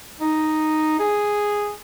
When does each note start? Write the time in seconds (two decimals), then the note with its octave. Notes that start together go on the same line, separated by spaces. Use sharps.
0.20 D#4
1.00 G#4